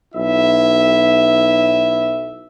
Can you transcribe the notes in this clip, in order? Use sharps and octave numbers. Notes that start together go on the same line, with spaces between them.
B1 E4 E5